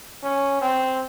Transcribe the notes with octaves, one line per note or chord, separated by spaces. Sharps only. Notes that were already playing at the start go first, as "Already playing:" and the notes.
C#4
C4